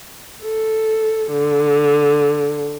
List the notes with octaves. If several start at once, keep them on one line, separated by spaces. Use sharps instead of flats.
A4
D3